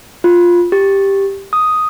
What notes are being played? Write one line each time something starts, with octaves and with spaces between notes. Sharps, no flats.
F4
G4
D#6